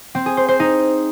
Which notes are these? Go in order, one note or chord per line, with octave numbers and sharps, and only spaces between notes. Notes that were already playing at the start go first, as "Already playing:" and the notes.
C4
G#4
C5
C5
D#4